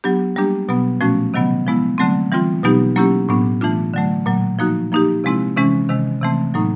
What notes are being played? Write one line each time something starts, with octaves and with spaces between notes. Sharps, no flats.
F#3 B3 D4 G4
G3 A#3 D4 G4
B2 F#3 B3
A#2 F3 A3 C#4 F#4
C3 D#3 F#3 B3
F3 G#3 B3 E4
D3 F#3 A3 C4
E3 G3 C4 F4
B2 F#3 B3 D#4 G4
F#3 A#3 C#4 E4 G4
A2 F#3 B3 D4
E3 A3 D4 F4
D3 F#3 A3
A#2 F#3 A#3
F3 A#3 D#4 F#4
F3 A#3 D#4 G4
C3 F3 G#3 C4 E4
C3 E3 G#3 C#4
C3 D#3 G#3
C3 E3 A3 C4
A2 F#3 A#3 D#4